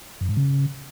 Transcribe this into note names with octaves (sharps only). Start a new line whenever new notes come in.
F#2
G#2
C#3